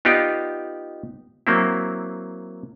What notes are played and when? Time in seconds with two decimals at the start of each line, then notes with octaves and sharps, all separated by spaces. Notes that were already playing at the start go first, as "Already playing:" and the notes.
0.05 B3 D#4 F4 G4 D5
1.47 F#3 A#3 C4 E4